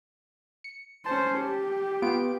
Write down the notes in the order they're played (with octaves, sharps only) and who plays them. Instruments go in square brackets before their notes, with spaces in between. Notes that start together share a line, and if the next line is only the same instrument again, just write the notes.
[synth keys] C#7
[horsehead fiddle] C#4 C5 [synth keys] A5
[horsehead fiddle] G4
[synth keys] B3 F4 D7